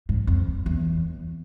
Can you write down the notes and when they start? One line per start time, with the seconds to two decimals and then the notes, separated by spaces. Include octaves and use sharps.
0.09 G#2
0.27 F2
0.66 E2